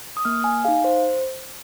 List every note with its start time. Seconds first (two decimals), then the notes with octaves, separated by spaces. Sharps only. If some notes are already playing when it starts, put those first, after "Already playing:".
0.17 D#6
0.25 A#3 F6
0.44 G#5
0.64 D#4 G#4 F5
0.84 C5